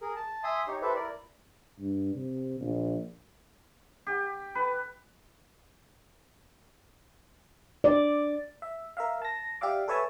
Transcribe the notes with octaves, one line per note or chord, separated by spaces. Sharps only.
G#4 A#4
A5
E5 G#5 C6 D#6
D#4 G4 C#5
E4 G4 A4 B4 C5 E5
E4 A#4 D5
G2
C3
A#1
G4
B4
D5
E5
A#4 E5 F5
A5 A#6
G4 D5 E5 F5 D6
A4 B4 C#5 E5 G#5 A5